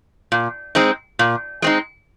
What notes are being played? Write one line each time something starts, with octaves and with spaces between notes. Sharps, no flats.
A#2
G#3 C4 D#4
A#2
G#3 C4 D#4